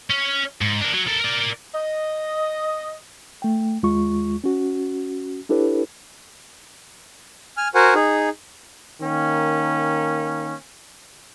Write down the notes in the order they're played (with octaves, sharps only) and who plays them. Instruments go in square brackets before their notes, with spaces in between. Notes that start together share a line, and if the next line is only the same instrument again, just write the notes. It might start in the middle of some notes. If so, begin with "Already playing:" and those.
[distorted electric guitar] C#4
G#2
D4 A#4
F#3
A4 A#4
A#4 D5
[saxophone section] D#5
[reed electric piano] A3 G5
D#2 G#3 F4 C#6
C#4 F#4
D4 E4 G4 A4 B4 C#5
[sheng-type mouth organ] G#5 F6
F#4 A#4 C5 F#5 G#5
D#4 G#4
[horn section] D#3 A#3 C#4